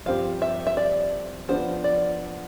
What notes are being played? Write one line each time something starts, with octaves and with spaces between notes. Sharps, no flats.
G2 F3 C4 G4 F5
E5
E5
D5
F3 B3 D4 F4 C5
D5